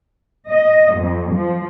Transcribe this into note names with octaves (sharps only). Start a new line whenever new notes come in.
D#5
F2
F3